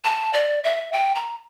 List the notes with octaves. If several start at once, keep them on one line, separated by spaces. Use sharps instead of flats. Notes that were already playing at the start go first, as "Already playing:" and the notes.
A5
D5
E5
G5
A#5